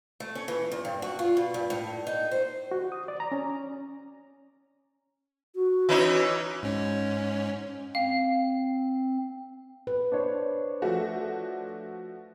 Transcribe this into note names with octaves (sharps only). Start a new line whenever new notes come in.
A3
C#4
E3
E2
G2
F#4
F4
B2
G2
A2
D#4
C5
F#4
D#6
D5
A#5
C#4
F#4
E3 C#4 D#4
G#2 C#4
C4 F5
B4
D4 C5 C#5
F3 A3 F#4